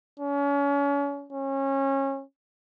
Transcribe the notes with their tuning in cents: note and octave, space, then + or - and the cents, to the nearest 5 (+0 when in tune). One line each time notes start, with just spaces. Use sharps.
C#4 +35
C#4 -25